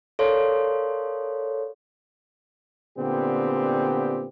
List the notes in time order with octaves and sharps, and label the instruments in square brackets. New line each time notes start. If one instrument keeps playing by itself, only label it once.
[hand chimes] A4 A#4 C#5 D5 F5 C6
[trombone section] A#2 D3 B3 C4 G4